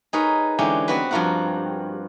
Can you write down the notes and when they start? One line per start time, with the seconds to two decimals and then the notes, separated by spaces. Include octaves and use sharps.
0.13 D#4 G#4 A#4 B4 C#5
0.59 D3 E3 G#3 C#4 G4
0.88 B3 C4 F#4 B4
1.11 G2 F3 F4 F#4 A#4 F#5